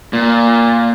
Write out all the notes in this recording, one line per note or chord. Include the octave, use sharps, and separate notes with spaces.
A#2